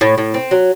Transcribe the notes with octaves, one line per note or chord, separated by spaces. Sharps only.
A2
A2
C4
F#3